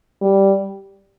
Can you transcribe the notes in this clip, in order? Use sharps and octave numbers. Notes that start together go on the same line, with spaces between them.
G3